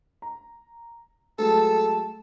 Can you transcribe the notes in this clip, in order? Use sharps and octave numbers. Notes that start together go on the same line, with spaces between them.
A#5
F#3 G#3 A3 A4 A5